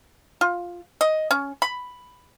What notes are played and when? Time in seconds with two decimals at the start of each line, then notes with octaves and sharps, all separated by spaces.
0.41 F4
1.01 D#5
1.31 C#4
1.62 B5